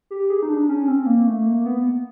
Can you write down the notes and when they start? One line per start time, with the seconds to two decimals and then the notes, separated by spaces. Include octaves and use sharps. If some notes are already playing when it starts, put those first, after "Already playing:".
0.11 G4
0.30 G#4
0.43 D#4
0.49 D4
0.69 C#4
0.88 C4
1.06 A#3
1.27 A3
1.46 A#3
1.65 B3